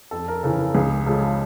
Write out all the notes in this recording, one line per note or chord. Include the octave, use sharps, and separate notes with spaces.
F2 A4
A#4
C#3 E3 A4
A4
C#2 G#4
C#3 F3 G#3 A4